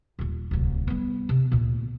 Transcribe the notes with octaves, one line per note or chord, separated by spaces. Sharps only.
D#1 F4
D1 C2
G3 B3
C3
D2 A#2